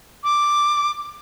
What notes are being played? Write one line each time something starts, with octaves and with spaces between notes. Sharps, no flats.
D6